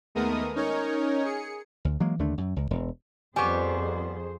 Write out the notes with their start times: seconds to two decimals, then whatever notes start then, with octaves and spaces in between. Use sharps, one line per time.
0.15 D#2 G#3 A3 B3 A#4 D#6
0.55 C#4 D#4 A#4 C#5
1.25 G#4 C#7
1.85 D2
2.00 E3 F#3 G#3 A#3
2.19 D#2 D3 A3 D4
2.38 F#2
2.56 C#2
2.71 E1
3.36 F2 G3 B3 G#4 C5 G#5 C#6